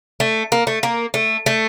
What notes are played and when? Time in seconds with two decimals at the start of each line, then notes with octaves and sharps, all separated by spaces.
0.20 A3
0.52 A#3
0.67 A3
0.83 A#3
1.14 A3
1.46 A3